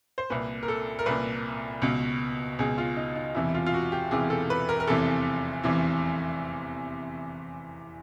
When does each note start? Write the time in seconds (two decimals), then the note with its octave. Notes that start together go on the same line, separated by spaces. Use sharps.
0.18 C5
0.30 C2 A#2 B4
0.63 A#4
0.68 A4
0.99 A#4
1.06 C2 A#2 B4
1.82 C#2 B2
2.59 C#2 B2 G#4
2.78 F4
2.97 D#4
3.16 D#4
3.34 E1 E2 C3 E3 E4
3.54 F4
3.66 F4
3.74 F#4
3.92 G4
4.11 E1 E2 C3 E3 G#4
4.30 A4
4.50 B4
4.69 A#4
4.80 A#4
4.87 F1 E2 C3 E3 A4
5.63 F1 E2 C3 E3